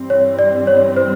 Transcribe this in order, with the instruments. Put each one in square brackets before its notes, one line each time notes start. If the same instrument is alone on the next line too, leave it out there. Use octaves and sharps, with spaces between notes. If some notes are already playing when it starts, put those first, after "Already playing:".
Already playing: [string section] G2 E3 G3 C4
[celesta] C#5
D5
C#5
C5